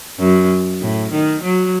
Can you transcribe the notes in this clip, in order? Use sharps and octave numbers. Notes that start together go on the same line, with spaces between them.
F#2
A2
D#3
F#3